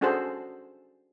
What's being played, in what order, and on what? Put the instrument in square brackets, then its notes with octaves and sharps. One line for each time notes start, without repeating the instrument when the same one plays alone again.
[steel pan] C#4 D4 F#4 G#4 A4 C5